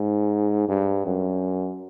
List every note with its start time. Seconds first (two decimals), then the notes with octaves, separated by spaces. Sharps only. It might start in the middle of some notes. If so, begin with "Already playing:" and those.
Already playing: G#2
0.69 G2
1.06 F#2